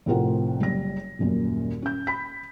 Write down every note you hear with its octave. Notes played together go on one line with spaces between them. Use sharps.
F1 A2 C4 F4 A#4 F#5
F#1 G3 A#6
D#1 F#2 A#2
C#4 G6
B5 B6